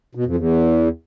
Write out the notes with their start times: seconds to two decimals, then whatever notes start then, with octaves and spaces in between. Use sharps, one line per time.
0.15 B2
0.26 F2
0.36 E2